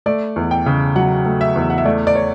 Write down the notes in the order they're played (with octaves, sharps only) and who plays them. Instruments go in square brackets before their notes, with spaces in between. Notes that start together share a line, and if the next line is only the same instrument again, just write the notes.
[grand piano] A3 D5
E2
G5
C#3
F#3 F#5
A3
E5
E2
F#5
E5
A3 D5
D5
C#5